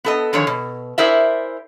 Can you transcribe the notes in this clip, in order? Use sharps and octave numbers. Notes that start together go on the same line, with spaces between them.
B3 A4 D#5
D3 D#3 F3 G#4 C#5
B2
E4 G#4 A#4 C5 D5 E5